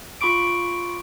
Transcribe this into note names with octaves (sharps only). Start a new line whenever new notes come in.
F4 B5 C#6 D6 D7